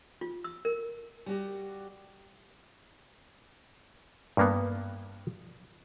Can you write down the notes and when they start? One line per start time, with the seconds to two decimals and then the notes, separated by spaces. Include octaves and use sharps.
0.21 F4
0.44 E6
0.65 A#4
1.26 G3 F#4 G4
4.37 G2 A#3 B3